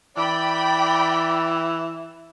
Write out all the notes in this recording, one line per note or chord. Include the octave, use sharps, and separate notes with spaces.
E3 D5 G5 B5